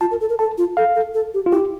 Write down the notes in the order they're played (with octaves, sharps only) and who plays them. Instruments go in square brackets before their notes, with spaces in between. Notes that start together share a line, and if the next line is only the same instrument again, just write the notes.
[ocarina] F4 [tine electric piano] A5
[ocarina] A#4
A4
A#4
[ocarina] A4 [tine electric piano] A5
[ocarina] F4
[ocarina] A4 [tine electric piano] F5
[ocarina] A4
A4
G4
[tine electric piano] F4
[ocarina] E4 [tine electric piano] G4